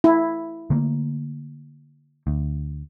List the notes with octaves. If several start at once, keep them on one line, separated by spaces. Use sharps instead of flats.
E4
D3 A3 A#3
D2